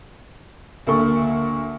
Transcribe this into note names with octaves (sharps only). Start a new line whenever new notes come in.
D2 A#3 A4 C#6